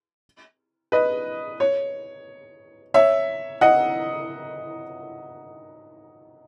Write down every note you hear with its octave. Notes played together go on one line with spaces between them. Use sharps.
B4 D#5
C#5
C#5 E5
D#5 F#5